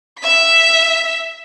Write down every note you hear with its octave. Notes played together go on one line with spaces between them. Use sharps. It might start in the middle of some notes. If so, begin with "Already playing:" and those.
E5 B6